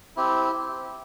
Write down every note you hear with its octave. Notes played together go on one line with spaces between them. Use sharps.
C4 E4 G4